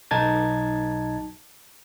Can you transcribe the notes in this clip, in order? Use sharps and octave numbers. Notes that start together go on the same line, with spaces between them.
B1 D#4 A5 G#6 A6